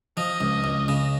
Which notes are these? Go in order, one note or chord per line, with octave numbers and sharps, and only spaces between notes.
F3 D#5
C#2
C#2
C#3